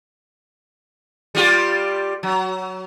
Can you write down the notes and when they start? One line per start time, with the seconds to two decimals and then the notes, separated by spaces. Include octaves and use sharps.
1.35 G3 F4 G4
2.23 F#3